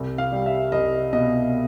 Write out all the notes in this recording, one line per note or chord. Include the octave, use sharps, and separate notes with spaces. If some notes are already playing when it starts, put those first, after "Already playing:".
Already playing: C2
F5
G3
E5
C2 D#5
B2 D#5